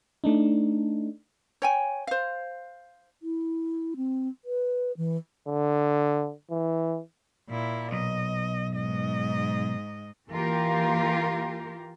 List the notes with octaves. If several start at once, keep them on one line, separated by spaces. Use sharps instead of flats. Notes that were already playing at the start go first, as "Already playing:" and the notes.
A3 D4 D#4
C#5 G5 G#5
C5 F5
E4
C4
B4
E3
D3
E3
A#2 E4
B1 D#5
G#2 D#5
E3 A#3 F4 G4 A#4